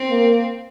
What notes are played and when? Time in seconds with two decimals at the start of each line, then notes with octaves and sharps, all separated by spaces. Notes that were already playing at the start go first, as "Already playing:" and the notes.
Already playing: C4
0.09 A#3